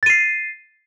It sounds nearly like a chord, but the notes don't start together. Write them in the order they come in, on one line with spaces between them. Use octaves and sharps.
A6 D#7 C7